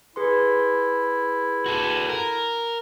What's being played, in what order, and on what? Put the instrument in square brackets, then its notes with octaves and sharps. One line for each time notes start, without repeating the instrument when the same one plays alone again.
[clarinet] E4 [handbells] G#4 B4 C6
[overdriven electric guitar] F#4 A4
A#4